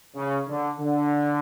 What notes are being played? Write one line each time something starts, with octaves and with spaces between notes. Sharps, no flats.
C#3
D3
D3